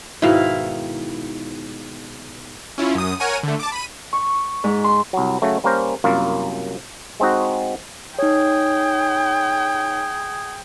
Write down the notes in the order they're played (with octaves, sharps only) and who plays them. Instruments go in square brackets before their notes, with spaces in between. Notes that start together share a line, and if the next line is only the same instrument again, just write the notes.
[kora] G#2 B2 D#3 [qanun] E4 F5
[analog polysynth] C#4 E4 F4
F#2 D#6
A#4 C#5 F#5 G#5 D#7
D3 A3
A5 D6
B5 D#7
[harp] C#6
G#2
C6
[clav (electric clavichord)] C2 F#3
C#3 F#3 A3
G3 A#3 C#4 A#4 C5
C2 F#2 A#3 F4
G#3 C4 D#4 F#4
[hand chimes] D#4 C#5 [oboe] G#4 [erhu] G5